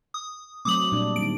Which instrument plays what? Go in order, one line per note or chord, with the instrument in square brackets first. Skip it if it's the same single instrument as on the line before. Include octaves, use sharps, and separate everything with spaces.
[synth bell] D#6
[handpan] F#3 A3 C4 [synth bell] D6 D#6 F#7
[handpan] A#2 G3 D4
[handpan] D#3 G3 C4 [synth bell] D7